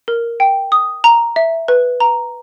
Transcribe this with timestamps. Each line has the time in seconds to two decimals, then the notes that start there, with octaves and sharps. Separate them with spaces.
0.08 A#4
0.40 G5
0.72 D#6
1.04 A#5
1.36 E5
1.68 B4
2.00 A#5